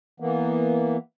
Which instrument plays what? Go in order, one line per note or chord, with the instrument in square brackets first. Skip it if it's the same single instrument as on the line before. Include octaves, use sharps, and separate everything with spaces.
[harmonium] E3 A#3 B3